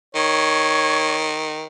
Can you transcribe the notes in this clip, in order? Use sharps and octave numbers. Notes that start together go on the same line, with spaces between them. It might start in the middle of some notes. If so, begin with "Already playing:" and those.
D#3 C#5